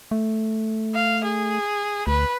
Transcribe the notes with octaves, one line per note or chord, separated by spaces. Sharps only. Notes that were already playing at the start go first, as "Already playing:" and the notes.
A3
F5
G#4
D2 B4